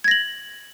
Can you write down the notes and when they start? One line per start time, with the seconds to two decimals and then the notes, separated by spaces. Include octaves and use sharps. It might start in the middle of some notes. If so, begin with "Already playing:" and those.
0.04 G#6
0.08 A#6
0.11 F#7